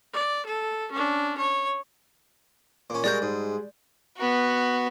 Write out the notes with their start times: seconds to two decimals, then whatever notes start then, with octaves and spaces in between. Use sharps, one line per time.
0.13 D5
0.46 A4
0.92 C#4 D4
1.38 C#5
2.90 A#2 C#4
3.04 G3 G#3 F#4 G#4 A#4 D5 G6
3.22 G#2
4.17 B3 F#4